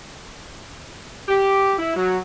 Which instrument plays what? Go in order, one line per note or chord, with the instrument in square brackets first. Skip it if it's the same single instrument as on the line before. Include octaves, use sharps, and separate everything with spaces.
[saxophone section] G4
E4
F#3